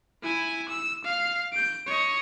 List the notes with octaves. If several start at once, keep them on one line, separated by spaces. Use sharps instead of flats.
E4 G#5
E6
F5
G6 D7
C#5 D#5